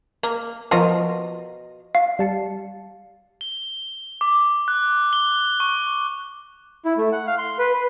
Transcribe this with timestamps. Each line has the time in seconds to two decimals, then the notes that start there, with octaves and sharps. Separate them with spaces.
0.23 A#3 A#4
0.71 B2 F3 F4 A#4 A#5
1.95 F5
2.19 G3 A5 C#7
3.41 G7
4.21 D6
4.68 F#6
5.13 G7
5.60 C#6
6.85 E4
6.97 A3
7.12 F#5
7.27 F5
7.38 C6
7.59 B4
7.73 B4